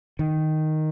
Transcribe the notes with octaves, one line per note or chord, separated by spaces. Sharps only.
D#3